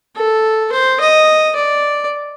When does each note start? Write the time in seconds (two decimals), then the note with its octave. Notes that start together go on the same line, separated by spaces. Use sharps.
0.16 A4
0.72 C5
1.00 D#5
1.55 D5